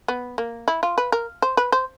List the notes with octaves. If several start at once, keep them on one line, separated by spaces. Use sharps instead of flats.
B3
A#3
E4
F4
B4
A#4
C5
B4
C5